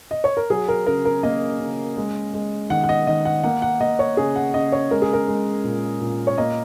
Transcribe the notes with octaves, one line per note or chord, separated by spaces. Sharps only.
D#5
C#5
A#4
F#3 G#4
A#4
C#3 A#4
A#4
A#3 D#5
C#3
G#3
G#3
D#3 F#5
F#5
D#5
D#3 D#5
F#5
A#3 F#5
F#5
A#3 D#5
C#5
C#3 G#4
F#5
C#3 D#5
C#5
G#3 A#4
G#4
A#4
G#3
A#2
A#2
C#5
A#3 D#5